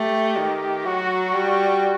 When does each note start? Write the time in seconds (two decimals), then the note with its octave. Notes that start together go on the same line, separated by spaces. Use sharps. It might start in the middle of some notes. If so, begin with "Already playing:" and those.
Already playing: A3 G4
0.39 D#3
0.86 F#3 F#4
1.34 G3